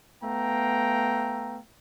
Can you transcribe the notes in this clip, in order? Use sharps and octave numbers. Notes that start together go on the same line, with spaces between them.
A3 B3 F5 G5 A#5